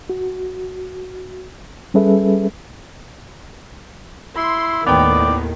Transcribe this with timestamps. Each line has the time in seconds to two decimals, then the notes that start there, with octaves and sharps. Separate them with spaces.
0.09 F#4
1.94 G3 C#4 G#4 A4 B4 E5
4.37 E4 C6
4.86 D#2 A2 D#3 B3 D5 G5